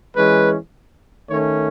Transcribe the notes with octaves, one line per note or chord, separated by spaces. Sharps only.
E3 G#3 C#4 B4
D#3 A3 C#4 C#5